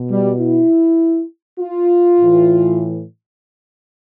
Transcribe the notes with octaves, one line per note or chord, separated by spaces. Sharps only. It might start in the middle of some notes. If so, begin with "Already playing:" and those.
Already playing: B2
G3
E4
F4
A2 E3